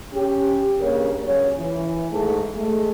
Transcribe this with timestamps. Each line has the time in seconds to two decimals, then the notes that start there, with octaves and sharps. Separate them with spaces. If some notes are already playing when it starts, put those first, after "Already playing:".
0.13 C#4 G4
0.79 G2 C#3 A#3 A#4 C#5
1.23 C#3 F#3 C#5
1.57 E3
2.11 G#2 A3
2.54 G#3 A3